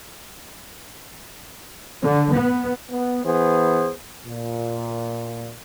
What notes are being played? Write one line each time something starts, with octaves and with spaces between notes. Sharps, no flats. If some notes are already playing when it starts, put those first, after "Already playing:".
D3
B3
B3
E3 B3 G#4 C5
A#2